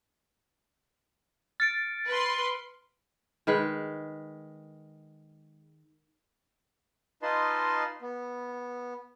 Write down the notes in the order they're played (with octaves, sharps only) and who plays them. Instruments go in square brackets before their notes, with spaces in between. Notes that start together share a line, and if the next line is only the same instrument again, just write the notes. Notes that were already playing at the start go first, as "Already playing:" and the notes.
[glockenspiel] F6 C#7 D7 [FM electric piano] A6
[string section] B4 C6
[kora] D#3 G#3 B4
[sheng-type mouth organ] D#4 F4 B4 D#5 A5 C6
B3